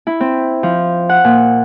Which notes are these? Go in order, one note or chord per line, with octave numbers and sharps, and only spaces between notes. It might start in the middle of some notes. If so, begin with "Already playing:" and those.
E4
C4
F3
F#5
A#2